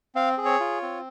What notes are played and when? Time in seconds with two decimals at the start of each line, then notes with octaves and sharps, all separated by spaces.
0.15 C4 F5
0.38 G#4
0.45 C#5
0.60 F4
0.82 C4